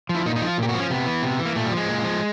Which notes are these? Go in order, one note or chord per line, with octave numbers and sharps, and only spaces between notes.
F3
E4
A#2 D#4
D#4
F3 E4 F4
A#2 G4
F#4
F3
C#4
C3 B3
E3
C3
E3
A#3
A#2 A3
G3
F3
G#3
A#2
F3